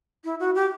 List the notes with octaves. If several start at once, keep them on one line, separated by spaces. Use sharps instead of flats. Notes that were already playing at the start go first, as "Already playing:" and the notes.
E4
F#4
G4